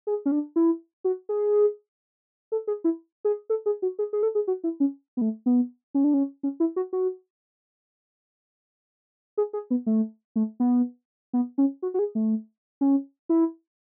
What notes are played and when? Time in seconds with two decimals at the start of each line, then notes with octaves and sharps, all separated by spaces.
0.07 G#4
0.26 C#4
0.31 D4
0.56 E4
1.04 F#4
1.29 G#4
2.52 A4
2.67 G#4
2.84 E4
3.25 G#4
3.50 A4
3.66 G#4
3.82 F#4
3.99 G#4
4.13 G#4
4.23 A4
4.35 G#4
4.47 F#4
4.64 E4
4.80 C#4
5.17 B3
5.21 A3
5.46 B3
5.94 C#4
6.04 D4
6.14 C#4
6.43 C#4
6.60 E4
6.76 F#4
6.93 F#4
9.37 G#4
9.53 G#4
9.70 B3
9.86 A3
10.36 A3
10.60 B3
11.33 B3
11.58 C#4
11.82 F#4
11.94 F#4
11.99 G#4
12.15 A3
12.81 C#4
13.29 E4